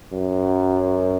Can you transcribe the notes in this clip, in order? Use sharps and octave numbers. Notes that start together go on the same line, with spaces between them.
F#2